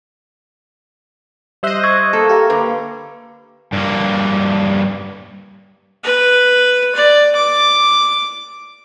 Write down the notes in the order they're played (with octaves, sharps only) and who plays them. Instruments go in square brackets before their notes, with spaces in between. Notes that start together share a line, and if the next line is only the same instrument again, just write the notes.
[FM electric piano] G3 E5 F#6 [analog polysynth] C5 D#5
[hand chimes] C#6 E6 G#6
[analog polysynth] A#3 [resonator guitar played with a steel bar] A4
[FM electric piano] G4 F5 A#5
[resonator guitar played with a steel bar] D3 [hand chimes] B4
[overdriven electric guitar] G2 A#3
[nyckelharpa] B4
D5
D6